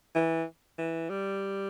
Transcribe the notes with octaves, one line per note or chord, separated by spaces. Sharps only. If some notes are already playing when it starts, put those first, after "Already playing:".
E3
E3
G3